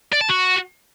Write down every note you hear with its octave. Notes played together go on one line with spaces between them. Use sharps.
D5
A5
F#4